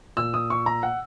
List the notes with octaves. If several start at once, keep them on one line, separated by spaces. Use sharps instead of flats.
A#2 E6
D#6
C#6
A#5
F#5